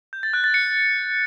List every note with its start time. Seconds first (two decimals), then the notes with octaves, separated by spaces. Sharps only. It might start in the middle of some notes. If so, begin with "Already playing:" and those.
0.13 G6
0.23 A6
0.33 F#6
0.44 A6
0.54 C#7